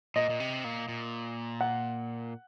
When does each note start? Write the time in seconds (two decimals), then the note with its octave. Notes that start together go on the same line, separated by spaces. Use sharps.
0.16 A#2 D#5
0.30 A#2
0.40 C3
0.64 A#2
0.88 A#2
1.61 F#5